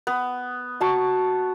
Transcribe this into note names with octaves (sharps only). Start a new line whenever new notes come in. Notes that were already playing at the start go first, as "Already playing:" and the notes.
B3
F#4 A5 C#6